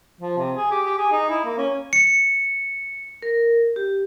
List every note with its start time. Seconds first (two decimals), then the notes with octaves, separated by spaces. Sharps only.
0.21 F3
0.37 C3
0.55 G#4
0.71 G4
0.86 G4
0.98 G#4
1.12 D#4
1.30 E4
1.45 A#3
1.58 C#4
1.93 C#7
3.22 A#4
3.76 G4